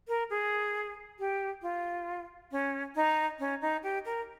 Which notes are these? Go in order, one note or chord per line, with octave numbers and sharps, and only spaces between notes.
A#4
G#4
G4
F4
C#4
D#4
C#4
D#4
G4
A#4